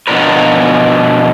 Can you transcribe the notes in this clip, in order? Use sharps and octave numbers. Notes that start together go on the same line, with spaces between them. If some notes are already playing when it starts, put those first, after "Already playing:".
B2 F3 B3 D4 A#4 B4